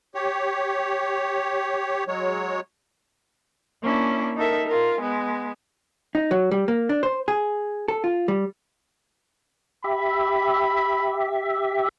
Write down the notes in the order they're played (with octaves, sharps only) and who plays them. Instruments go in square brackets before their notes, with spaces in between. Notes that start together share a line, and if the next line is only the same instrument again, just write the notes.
[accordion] G4 C#5
F#3 G#3 C#5
[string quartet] A#3 C#4 D4 E4
D#4 A4 A#4 E5
F4 A#4
G#3 B3
[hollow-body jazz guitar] D#4
F#3
G3
A#3
D4
C5
G#4
A4
F4
G3
[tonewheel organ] G4 E5 [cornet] B5